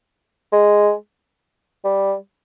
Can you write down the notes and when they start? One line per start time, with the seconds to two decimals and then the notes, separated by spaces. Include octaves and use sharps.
0.52 G#3
1.84 G3